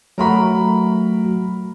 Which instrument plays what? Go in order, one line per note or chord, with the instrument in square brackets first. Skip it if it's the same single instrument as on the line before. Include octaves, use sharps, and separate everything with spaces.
[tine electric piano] F#3 A3 F#4 [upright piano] A#4 A#5 B5